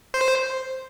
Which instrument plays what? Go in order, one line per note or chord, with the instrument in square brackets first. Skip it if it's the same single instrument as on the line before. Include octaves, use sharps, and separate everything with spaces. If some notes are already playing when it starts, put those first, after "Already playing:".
[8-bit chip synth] C5